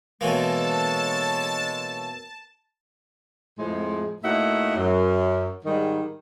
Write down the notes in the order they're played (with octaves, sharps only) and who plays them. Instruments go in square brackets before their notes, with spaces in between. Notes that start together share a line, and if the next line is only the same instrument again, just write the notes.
[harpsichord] B2 E3 A#3 [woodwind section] G#3 [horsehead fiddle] A4 C#5 [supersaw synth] A5
[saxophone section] F2 A2 F3 G#3
A2 A#3 D#4 F#4 E5 F#5
F#2
G#2 D#3 G3